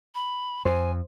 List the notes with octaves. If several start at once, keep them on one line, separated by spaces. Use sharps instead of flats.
B5
F2 C5 G#5